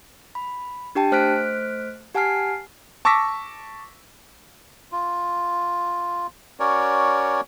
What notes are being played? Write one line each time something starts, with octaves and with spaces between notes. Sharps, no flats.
B5
D4 G4 G5 A5
A3 C5 F6 F#6 B6 D7
G4 F#5 G#5 A5 F6 C7
A5 C#6 D6 E6 A#6 B6
F4
C#4 F#4 A#4 C#5 D5